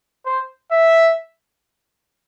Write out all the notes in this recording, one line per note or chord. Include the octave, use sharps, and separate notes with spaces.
C5
E5